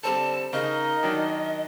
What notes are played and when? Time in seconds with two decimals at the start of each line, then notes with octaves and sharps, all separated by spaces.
0.03 D3 G3 C4 A4 A5
0.53 C#3 D#4 A#4 D#5
1.03 D#3 F#3 D4